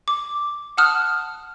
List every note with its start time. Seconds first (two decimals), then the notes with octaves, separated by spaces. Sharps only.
0.08 D6
0.77 F#5 A5 D#6 F6 F#6